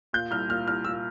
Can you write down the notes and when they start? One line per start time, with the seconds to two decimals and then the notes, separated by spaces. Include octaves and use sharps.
0.13 A#2 G6
0.31 C2 F6
0.49 A#2 F6
0.67 C2 F6
0.85 A#2 E6